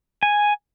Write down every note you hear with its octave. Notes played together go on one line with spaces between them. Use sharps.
G#5